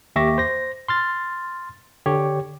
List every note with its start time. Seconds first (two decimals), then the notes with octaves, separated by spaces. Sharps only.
0.16 D#2 G4 E5 C#6 D6 A#6
0.38 C5 A#6
0.88 C6 F6 A6
2.06 D3 G4 C#5